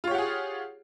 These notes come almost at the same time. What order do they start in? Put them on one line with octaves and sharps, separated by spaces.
F4 C#5 G4 F#5 G#4